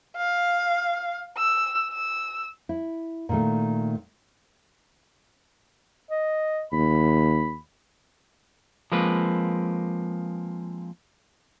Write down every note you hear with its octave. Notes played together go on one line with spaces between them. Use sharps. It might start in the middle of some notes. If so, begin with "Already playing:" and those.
F5
E6
E6
E4
A#2 D#3 A3
D#5
D#2 B5
F3 G#3 A#3 C4 B4